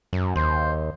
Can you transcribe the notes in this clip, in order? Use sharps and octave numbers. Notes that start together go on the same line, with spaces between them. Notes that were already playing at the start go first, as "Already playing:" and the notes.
F#2
D#2 C5